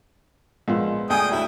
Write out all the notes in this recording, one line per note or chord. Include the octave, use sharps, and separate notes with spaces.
A#1 G#3 B3 F4
D2 G#4 G5 G#5 D#6
D2 F#3 E4